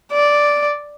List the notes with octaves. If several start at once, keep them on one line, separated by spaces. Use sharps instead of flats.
D5